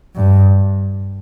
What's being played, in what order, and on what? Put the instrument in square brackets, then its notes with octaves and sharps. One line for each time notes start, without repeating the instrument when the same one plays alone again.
[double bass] G2